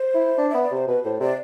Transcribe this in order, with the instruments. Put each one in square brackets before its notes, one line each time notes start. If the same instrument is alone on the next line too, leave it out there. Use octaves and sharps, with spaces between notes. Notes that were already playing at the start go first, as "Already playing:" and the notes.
Already playing: [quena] C5
[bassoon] E4
D4
[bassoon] B3 [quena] E5
[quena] D5
[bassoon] C3 [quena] C5
[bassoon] B2 [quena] B4
[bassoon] A2 [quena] C5
[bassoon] C3 [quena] D5